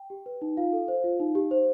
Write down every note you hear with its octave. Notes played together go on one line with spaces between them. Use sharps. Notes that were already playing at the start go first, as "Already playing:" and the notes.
Already playing: G5
G4
B4
D#4
F4 F5
A4
C5
F4
D#4
G4
C5